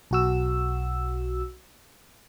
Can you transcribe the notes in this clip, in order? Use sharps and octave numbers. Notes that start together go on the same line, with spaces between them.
B1 F#4 E6